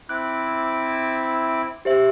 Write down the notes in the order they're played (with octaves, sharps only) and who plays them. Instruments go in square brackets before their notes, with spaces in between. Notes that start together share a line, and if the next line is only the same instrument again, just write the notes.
[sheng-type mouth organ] C4 E4 D6 [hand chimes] F#6
[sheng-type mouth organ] C4 [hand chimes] G4 C5 E5